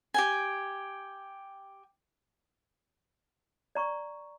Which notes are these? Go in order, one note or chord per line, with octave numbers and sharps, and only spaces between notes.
G4 G5 G#5
D5 A#5 C#6